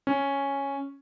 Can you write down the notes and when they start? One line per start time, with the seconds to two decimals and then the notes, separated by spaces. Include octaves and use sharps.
0.07 C#4